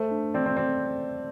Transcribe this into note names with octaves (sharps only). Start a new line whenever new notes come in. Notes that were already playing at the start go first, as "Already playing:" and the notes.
Already playing: A3 C5
D4
C4 D5
C4
C4 D5